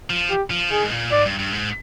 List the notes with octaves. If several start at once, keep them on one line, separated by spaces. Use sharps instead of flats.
F3
G4
F3
D#3 G#4
G#2
A#2
G#2 D5
G2
G2
G#2